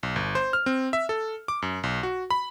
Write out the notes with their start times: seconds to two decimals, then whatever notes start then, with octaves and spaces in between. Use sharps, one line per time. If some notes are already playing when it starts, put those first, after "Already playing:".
0.03 B1
0.16 G1
0.35 C5
0.53 F6
0.66 C4
0.93 E5
1.09 A4
1.48 D6
1.62 F#2
1.83 B1
2.03 F#4
2.30 B5